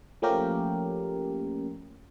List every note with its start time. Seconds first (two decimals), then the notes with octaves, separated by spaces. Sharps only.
0.22 F3 A3 A#3 C#4 G4 A#4